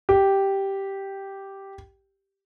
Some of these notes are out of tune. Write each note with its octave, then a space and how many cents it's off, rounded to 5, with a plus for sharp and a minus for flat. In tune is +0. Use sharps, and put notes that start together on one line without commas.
G4 -5